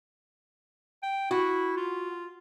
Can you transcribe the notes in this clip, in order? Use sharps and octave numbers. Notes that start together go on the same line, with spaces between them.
G5
E4 F#4
F4